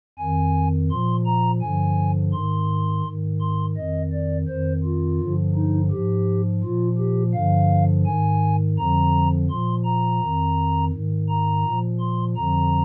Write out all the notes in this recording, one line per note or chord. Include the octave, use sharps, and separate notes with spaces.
F2 D#3 G#5
A#2 F3 C6
A#5
G2 D3 F3 G#5
G#2 D#3 C6
G#2 D#3
C6
F2 D#3 D#5
D5
F2 D#3 C5
F4
G2 D3 F3
D#4
G#2 F3 G4
A#2 F3 F4
G4
G2 D3 F3 F5
G#2 D#3 G#5
F2 D3 F3 A#5
A#2 F3 C6
A#5
F2 D#3
G#2 D#3
A#5
A#2 F3
C6
F2 D3 F3 A#5